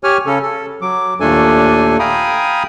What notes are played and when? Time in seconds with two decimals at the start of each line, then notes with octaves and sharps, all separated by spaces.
0.04 G4 C#5 G#5 F6
0.26 C#3 C#4 A4
0.42 A4
0.82 F#3 D6
1.20 D#2 A#2 A3 D4 A4 G#5
1.99 F5 G5 G#5 A#5 B5 D#6